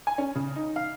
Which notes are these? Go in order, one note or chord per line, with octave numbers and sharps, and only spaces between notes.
G#5
C#4
C#3
D#4
F5